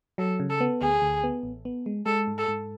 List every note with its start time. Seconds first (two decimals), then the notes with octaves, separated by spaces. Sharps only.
0.18 F#3 A4
0.40 C#3
0.50 A4
0.61 B3
0.81 D2 G#4
1.02 D2
1.24 B3
1.43 A1
1.65 B3
1.86 G#3
2.06 G#3 A4
2.27 G#2
2.38 A4
2.48 G#2